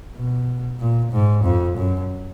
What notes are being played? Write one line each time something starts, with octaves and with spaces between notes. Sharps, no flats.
B2
A#2
G#2
F2
F#2